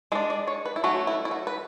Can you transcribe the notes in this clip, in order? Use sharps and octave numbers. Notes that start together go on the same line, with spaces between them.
G#3 D4 E4
D5
C#5
B4
E4
F#3 A3 C#4 F#4
E4
E4
F#4
B4